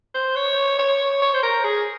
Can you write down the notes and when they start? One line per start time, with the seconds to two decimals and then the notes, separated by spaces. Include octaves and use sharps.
0.14 C5
0.36 C#5
0.79 C#5
1.22 C#5
1.34 C5
1.43 A#4
1.64 G#4